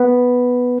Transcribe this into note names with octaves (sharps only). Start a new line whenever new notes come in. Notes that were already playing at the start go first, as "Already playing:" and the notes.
Already playing: B3 B4